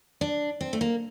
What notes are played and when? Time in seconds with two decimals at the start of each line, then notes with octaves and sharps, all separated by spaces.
0.21 D4
0.61 C4
0.73 A3
0.81 A#3